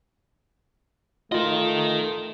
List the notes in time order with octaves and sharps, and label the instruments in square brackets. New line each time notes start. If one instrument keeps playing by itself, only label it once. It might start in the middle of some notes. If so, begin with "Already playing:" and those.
[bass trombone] A3 [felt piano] F4 [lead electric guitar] A#4 D#5